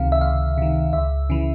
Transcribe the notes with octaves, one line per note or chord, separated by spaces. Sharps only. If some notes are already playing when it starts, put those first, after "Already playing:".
Already playing: C#2 C3 D#3 F5
E5
C#2 F5
C3 D#3
C#2 E5
C#3 E3